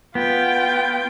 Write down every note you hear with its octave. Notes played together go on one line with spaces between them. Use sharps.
B3 F4 G5